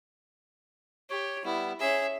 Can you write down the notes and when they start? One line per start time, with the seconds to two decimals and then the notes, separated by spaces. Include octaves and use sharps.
1.10 G4 C#5
1.45 G3 B3 E4
1.80 C#4 G#4 E5